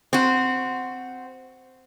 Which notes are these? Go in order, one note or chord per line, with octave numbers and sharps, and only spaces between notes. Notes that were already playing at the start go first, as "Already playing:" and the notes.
C4 F#4